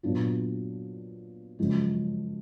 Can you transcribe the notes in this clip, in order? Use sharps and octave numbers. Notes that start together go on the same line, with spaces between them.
A#2 F#3 B3 D4 F4
F#2 C#3 F3 G#3